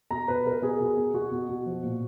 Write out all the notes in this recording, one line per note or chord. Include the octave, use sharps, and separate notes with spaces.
B2 A#5
B2 B4
B2 A#4
B2 G#4
B2
B2
B2 F#4
B2
B2
F3
A#2